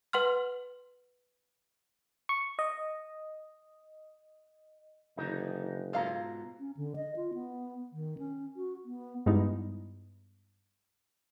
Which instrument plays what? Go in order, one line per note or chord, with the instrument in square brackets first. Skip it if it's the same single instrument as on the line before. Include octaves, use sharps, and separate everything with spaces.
[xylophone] B4 F#5 C6 F6
[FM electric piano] C#6
D#5
[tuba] F#1 [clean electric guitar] D3 E3 D#4
[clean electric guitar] G#2 B2 A#5 [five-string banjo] F4 A4 F5
[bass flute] C#4
D3
D#5
F4
B3
D#3
C#4
F#4
B3
[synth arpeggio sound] G2 G3 G#3 B3 D#4 E4